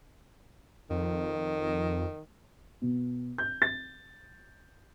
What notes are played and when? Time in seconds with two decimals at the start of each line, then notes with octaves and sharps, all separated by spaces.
0.90 F2 D#3
2.82 B2
3.38 G6
3.62 A6